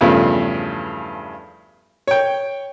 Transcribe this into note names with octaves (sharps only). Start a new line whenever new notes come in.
E2 G2 C#3 F3 A3
C#5 G5